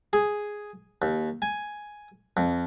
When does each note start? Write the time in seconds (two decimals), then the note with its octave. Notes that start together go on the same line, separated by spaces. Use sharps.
0.13 G#4
1.02 D#2
1.42 G#5
2.37 F2